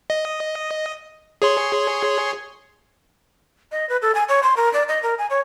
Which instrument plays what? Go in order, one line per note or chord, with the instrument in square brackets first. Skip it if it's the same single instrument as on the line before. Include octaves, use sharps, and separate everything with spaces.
[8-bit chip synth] D#5
G#4 C#5 C6
[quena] D#5
B4
A4
G#5
C#5
C6
A#4
D5
D#5
A#4
G#5
C#5